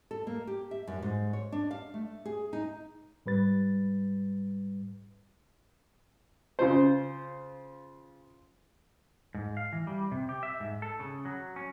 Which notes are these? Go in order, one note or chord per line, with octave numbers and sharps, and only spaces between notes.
A4
A#3
G4
E5
F#2
G#2
C#5
D4
F5
A3
G#4
D#4
G#2 G3 B4 A6
C#3 F4 C5
G#2
F5
E3
G3
C3
G4
E5
G#2
A4
C#3
F#3
C#4